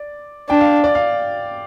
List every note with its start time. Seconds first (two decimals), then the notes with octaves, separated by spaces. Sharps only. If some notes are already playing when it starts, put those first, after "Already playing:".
Already playing: D5
0.49 D4 G5
0.60 F5
0.84 D5
0.95 F5